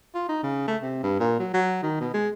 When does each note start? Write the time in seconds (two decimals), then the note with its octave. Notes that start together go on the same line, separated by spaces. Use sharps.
0.14 F4
0.29 D#4
0.43 C#3
0.68 A3
0.82 C3
1.03 G2
1.20 A#2
1.40 F#3
1.54 F#3
1.83 D#3
2.01 B2
2.14 G#3